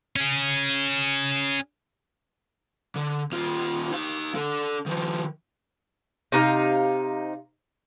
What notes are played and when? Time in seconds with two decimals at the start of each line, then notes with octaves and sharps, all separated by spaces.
0.16 C#4 G#4
2.96 D3
3.32 D#2 F4
3.92 D#4 F5
4.35 D4 A4
4.86 D#3 F3
6.32 C3 D#4 B4 F5